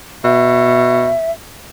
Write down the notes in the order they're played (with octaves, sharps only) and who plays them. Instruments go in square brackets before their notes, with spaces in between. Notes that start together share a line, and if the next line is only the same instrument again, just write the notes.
[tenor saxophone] B2 [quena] E5